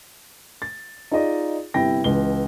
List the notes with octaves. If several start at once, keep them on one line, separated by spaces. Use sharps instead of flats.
A6
D#4 F4 G#4 D5 D#5
G1 C3 E4 G5 A#6
C#2 E3 G#3 G7